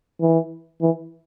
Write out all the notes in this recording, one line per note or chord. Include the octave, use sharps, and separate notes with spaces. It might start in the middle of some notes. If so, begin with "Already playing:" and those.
E3
E3